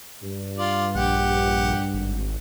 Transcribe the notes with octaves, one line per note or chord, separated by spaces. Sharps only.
G2
F4 D5
A#1 G4 F#5
G#1